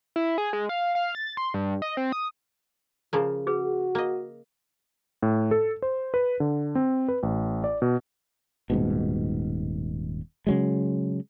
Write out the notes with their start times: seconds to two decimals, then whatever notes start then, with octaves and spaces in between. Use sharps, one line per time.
0.16 E4
0.38 G#4
0.53 G#3
0.69 F5
0.95 F5
1.15 A6
1.37 C6
1.54 G2
1.82 D#5
1.97 C4
2.12 D#6
3.13 C#3 F3 A#3
3.47 F#4 G#4 B4
3.95 A#3 D#5
5.23 A2
5.51 A4
5.82 C5
6.14 B4
6.40 D3
6.75 C4
7.09 B4
7.23 A1
7.64 D5
7.82 B2
8.70 D#1 G#2 B2
10.47 C#3 F#3 G#3